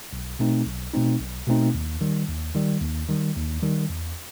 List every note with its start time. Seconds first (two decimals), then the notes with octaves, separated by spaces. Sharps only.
0.13 B1
0.39 B2 A3 C4 D#4
0.66 B1
0.93 B2 A3 C4 D#4
1.20 B1
1.47 B2 A3 C4 D#4
1.74 D#2
2.01 D#3 G3
2.28 D#2
2.55 D#3 G3
2.82 D#2
3.09 D#3 G3
3.36 D#2
3.62 D#3 G3
3.89 E2